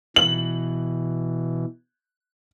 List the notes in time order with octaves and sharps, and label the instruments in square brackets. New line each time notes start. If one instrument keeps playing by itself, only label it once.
[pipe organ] B2 E3 [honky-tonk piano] F#7